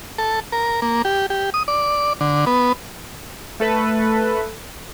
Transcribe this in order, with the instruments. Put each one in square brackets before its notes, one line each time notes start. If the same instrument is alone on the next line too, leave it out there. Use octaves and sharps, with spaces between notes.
[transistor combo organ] A4
A#4
A#3
G4
G4
D#6
D5
D3
B3
[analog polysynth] A3 A4 B4